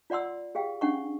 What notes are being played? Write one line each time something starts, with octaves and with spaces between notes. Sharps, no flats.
F4 D5 F#5 C6 E6
G4 G#4 F5 G5
C#4 D4 F#5 C#6